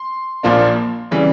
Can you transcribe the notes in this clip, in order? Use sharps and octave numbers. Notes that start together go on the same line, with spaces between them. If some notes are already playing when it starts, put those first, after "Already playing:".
Already playing: C6
A#1 A#2 F3 A#3 D4
C#3 E3 G3